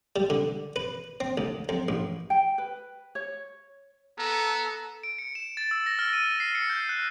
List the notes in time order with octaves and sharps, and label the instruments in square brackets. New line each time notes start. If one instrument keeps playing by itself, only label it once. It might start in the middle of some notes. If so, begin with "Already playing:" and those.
[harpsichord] G3
D3
B4
C4
D2
F2
A1
[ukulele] G5
B4
C#5
[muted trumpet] B3 [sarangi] A4 [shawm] A#5
[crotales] D7
C#7
E7
A6
E6
A#6
F6
D#7
C7
C#7
G6
F#6